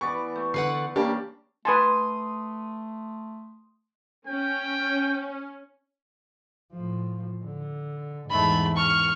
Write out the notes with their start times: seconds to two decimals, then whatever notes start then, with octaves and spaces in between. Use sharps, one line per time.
0.01 E3 B3 D5 C#6
0.36 A3
0.54 D3 B4 F#5 C7
0.96 C#3 G3 A#3 D4 G4
1.65 A3 B4 G#5 A5 C6 D#6
4.27 C#4 G5
6.72 A2 F3
7.44 D3
8.30 E2 G#2 A3 B5
8.76 C#6 F6